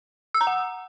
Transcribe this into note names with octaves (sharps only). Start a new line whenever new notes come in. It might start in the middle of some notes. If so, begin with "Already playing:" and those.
E6
A#5
F#5